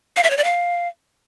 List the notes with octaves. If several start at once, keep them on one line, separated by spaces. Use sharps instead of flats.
F5
E5
C#5
D5
F5